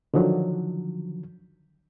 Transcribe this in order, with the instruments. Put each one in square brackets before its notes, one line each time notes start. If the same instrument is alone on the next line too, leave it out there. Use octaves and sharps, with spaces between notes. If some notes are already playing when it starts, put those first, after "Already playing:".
[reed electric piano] D3 D#3 F3 F#3